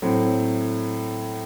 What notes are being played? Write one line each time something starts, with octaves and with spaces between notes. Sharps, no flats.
A2 F#3 C4